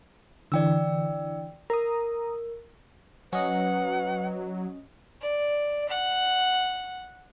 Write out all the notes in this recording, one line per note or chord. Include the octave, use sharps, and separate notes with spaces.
D3 E3 D5 G5 E6
A#4 A#5 D#6
F#3 C#4 B4 D#5 F#5
D5
F#5